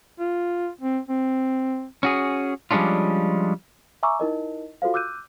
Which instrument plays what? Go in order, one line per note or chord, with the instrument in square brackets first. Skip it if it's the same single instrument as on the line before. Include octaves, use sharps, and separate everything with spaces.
[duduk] F4
C4
C4
[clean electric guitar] C#4 F#4 G#4
F3 G3 G#3 C#4 D4 F4
[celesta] E5 G#5 A#5 C#6 D6 E6
D#4 E4 A#4 D#5
F4 F#4 A4 C5 F5
D6 E6 F#6 G6 D#7